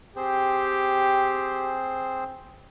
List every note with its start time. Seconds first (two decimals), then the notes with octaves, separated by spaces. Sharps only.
0.16 C4 G4 G#4 C5